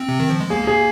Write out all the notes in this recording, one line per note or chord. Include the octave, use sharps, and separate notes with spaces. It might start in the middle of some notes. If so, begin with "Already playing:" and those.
Already playing: C4
C3
D#3
F3
G#3
A#3 G#4
G#4